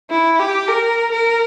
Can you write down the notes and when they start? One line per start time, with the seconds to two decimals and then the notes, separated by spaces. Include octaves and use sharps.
0.10 E4
0.40 G4
0.68 A#4
1.11 A#4